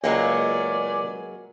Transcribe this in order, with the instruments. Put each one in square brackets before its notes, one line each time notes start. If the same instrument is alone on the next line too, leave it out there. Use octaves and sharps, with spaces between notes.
[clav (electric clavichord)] C#2 [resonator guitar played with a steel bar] F#3 G#3 A#3 [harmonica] D5 G#5